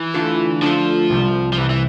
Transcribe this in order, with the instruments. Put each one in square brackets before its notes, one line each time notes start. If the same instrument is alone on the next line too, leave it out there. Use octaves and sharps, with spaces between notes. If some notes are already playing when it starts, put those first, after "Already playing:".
Already playing: [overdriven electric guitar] E3
[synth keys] D3 A3 D4 F4 A4
[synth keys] D3 A3 D4 F4 A4 [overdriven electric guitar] F3
[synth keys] C2 C3 G3
[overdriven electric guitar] F3
[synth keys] C2 C3 G3 [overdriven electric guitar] E3
[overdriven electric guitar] E3